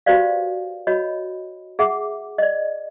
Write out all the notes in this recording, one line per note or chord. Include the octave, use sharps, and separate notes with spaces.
F#4 G4 B4 C5 D5 F5
F#4 C#5 D#5 B5
G#4 E5 F#5 D6
D5 D#5